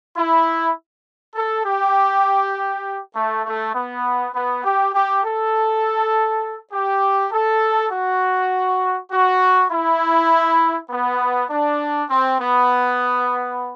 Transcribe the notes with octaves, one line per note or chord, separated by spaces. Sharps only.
E4
A4
G4
A3
A3
B3
B3
G4
G4
A4
G4
A4
F#4
F#4
E4
B3
D4
C4
B3